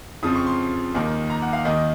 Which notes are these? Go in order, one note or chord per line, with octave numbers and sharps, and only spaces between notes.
F2 C#3 F3 C4 D#6
C#6
C6
D#2 D#3 A#3 D#4
A#5
F#5
F5
D#2 D#3 A#3 D#4 D#5